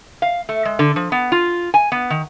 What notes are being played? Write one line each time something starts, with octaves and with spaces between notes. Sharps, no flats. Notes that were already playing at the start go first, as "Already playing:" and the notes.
F5
A3
G#3
D3
F3
B3
F4
G#5
B3
D#3